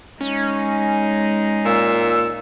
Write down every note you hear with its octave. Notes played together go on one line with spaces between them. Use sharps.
G#3 C#4 D#4
A#2 E6